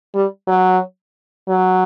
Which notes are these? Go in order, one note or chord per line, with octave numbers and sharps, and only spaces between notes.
G3
F#3
F#3